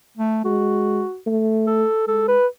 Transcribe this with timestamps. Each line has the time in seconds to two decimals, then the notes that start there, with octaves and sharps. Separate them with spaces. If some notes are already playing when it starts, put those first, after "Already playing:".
0.17 A3
0.45 G#3 F#4
1.27 A3
1.67 A4
2.07 G#3 A4
2.28 B4